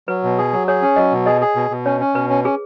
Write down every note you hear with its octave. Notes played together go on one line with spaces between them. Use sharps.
F#3 B4
B2
G#4
F#3
G#4 C#5
C#4
F#3 D#5
B2
G#4 D#5
G#4
B2
B2
C#4 C#5
C#4
B2 B4
C#4
C#4 G#4